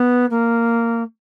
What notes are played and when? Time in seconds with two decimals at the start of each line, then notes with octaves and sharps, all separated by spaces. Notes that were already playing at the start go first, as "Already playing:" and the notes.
Already playing: B3
0.30 A#3